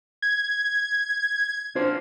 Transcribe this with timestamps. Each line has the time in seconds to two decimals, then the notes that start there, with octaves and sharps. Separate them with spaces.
0.22 G#6
1.75 D4 F4 C5